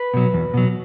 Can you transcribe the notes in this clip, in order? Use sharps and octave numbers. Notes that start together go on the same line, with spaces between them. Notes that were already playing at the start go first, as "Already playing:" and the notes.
Already playing: B4
B2 F#3
E2
B2 F#3